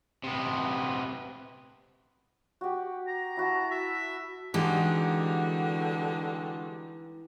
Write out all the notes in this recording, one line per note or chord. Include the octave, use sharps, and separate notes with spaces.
C3 B3
F#4 G4
A#5
E4 F#4 A5
E5
D3 E3 G3 G#3 D#4 F#4 G4